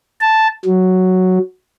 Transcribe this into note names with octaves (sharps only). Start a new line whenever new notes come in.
A5
F#3